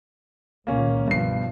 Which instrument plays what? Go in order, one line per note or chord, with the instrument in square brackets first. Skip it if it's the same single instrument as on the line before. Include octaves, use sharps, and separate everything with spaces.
[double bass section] C#2 A#2 D#3 [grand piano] A#3 C#4
[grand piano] G2 C7 [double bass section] B2 F3 B3